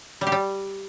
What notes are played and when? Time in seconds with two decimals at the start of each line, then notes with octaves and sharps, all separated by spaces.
0.21 G3
0.27 G4
0.32 G3